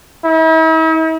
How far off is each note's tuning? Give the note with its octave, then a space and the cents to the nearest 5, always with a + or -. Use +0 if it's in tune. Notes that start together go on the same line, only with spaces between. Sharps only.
E4 -45